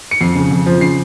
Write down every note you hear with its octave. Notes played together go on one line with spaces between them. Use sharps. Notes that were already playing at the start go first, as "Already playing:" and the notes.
C#7
F2 C7
C#3
F2
F3
C#3 C7